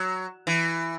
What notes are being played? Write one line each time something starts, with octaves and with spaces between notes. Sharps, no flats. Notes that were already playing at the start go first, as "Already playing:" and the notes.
Already playing: F#3
E3